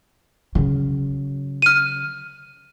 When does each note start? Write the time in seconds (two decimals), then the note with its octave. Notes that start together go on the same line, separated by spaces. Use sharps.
0.55 C#3 F#3
1.62 F6 D#7